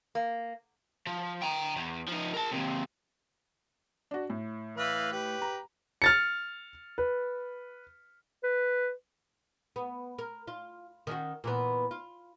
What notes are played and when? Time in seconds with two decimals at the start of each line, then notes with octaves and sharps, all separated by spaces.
0.15 A#3
1.06 F3
1.42 G5 A#5
1.76 E2
2.08 F3 D#4
2.33 A#4 A5
2.51 D#2 C3
4.11 D4 F#4
4.30 A2
4.77 E3 B4 F5
5.12 G4 B4
5.42 A#5
6.02 F6 A6 C#7
6.98 B4
8.43 B4
9.76 B3
10.18 A#4
10.47 F4
11.07 D#3 C#4 F#4
11.44 A#2 E3 B3
11.91 F4